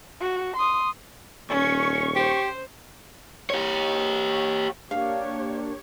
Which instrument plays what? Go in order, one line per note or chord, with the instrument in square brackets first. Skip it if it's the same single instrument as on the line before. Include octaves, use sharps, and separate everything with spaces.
[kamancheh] F#4
C6 D#6
[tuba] D#1 [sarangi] C#4 [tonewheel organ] C#6
[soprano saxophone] G4 [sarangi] C5
[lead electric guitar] G4 C#5
[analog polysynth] A#3 D4 [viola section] G4 C#5 [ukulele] F5